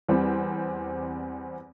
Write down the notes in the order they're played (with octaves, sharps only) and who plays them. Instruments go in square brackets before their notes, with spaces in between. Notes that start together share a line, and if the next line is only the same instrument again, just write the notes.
[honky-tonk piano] E2 G3 C4